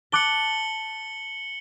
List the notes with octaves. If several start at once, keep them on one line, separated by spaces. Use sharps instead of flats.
A5 D6 F#6 C#7 F#7 G7